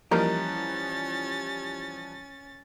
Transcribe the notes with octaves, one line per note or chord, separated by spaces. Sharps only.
E3 F3 G3 A#3 C#4 D#4 A#4 A6